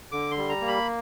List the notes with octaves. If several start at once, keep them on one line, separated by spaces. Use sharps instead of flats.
D3 D6
C6
G3
A#5
A#3
B5